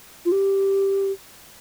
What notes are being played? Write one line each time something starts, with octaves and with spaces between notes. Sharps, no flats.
F4
G4